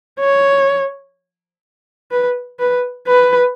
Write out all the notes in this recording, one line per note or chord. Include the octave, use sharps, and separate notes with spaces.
C#5
B4
B4
B4